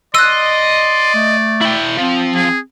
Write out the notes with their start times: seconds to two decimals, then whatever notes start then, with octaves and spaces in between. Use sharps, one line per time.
0.15 D5 D#5 C6 E6 F#6
1.15 A3
1.61 E4 G5
1.97 F3 C4
2.35 G#4